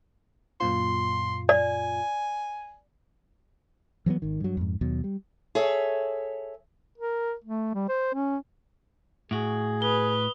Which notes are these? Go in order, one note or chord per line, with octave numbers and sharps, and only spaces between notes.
F#2 A#2 F4 C6
D5 G#5
E3 F#3 G#3 B3
G#1 D#3
G2 F#3
F2 G#2
D#2 B2 F#3
G3
G#4 A4 C#5 E5
A#4
A3
G3
C5
C#4
A2 F#4 G#4
B4 D#6 G7